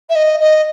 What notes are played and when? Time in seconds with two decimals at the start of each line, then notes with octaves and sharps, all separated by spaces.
0.09 E5
0.15 D#5
0.40 D#5